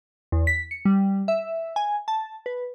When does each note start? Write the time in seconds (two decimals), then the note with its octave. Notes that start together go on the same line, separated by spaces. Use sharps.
0.32 E2
0.47 B6
0.71 C#7
0.85 G3
1.28 E5
1.76 G#5
2.08 A5
2.46 B4